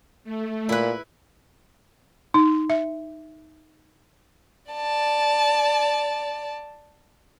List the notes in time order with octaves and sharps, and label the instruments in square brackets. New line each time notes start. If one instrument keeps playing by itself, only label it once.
[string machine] A3
[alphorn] A#2 [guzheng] E4 B4
[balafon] D#4
E5
[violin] D5 A5